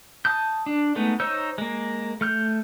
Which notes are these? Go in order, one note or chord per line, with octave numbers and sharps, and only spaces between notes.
A5 D#6 G6
D4
G#3 A3 B3 D#4
D#4 C5 C#5 E6 G6
G#3 A#3
A3 F6 G6